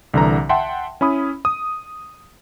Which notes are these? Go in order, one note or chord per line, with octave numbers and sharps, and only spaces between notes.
C2 D3 E3 A#5
E5 F#5 G5 A5 C6
C#4 E4 B5 D#6
D#6